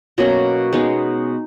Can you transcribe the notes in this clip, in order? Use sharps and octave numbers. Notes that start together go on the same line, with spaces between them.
B2 F#3 A#3 C#4
G#3 B3 D#4